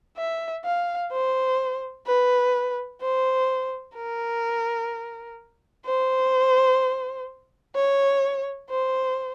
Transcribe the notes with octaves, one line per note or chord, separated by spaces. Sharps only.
E5
F5
C5
B4
C5
A#4
C5
C#5
C5